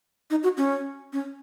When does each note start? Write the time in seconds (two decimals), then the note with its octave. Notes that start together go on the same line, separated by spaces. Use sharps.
0.30 D#4
0.43 F#4
0.57 C#4
1.13 C#4